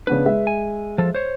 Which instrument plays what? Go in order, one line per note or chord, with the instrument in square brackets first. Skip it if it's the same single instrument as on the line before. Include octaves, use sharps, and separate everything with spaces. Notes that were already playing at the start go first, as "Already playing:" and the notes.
[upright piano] C#3 B3 D4 [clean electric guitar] B4
[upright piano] G#3 E5
[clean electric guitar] G#5
F3 A4
C5 C#5